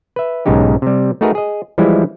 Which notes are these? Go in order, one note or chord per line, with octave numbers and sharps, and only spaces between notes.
B4 E5
B1 G#2 C#3 D#4 G4
C3 G3
A3 D#4 F#4 G#4 A#4 B4
G#4 D#5
E3 F3 G3 G#3 E4